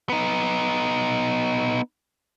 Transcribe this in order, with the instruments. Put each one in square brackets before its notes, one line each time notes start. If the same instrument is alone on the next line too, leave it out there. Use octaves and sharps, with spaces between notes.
[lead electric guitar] B3 D#4